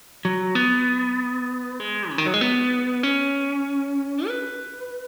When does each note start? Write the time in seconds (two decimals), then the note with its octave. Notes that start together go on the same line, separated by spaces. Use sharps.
0.25 F#3
0.55 B3
1.80 G#3
2.10 C#3
2.18 D#3
2.26 F#3
2.34 G#3
2.41 B3
3.03 C#4
4.27 B4